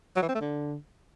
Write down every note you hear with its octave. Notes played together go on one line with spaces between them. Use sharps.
F#3
E3
C4
A3
D3